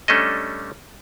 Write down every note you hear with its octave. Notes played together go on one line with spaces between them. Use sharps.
G3 A3 C#4 D4 A4 D#5